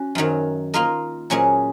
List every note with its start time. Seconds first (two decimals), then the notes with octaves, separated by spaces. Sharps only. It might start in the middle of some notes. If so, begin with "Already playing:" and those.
Already playing: C#4 F#4
0.15 F#2 D#3 F#3
0.74 A#3 F4 A#4 D#5
1.30 A#2 F#3 C#4 G#4 D#5